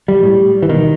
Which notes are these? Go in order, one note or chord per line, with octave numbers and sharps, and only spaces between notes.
G3
A2
E3
B2 D#3